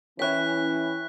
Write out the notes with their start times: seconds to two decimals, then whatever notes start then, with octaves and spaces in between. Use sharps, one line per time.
0.19 E3 C#4 E4 C#5 G5 F#6 B6